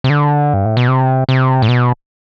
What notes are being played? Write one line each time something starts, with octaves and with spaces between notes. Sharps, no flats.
C3
D3
G2
A2
B2
C3
C3
A2
B2